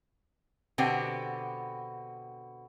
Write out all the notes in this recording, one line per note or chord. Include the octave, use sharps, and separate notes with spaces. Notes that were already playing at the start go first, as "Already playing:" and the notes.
B2 D3 B3 C4 G4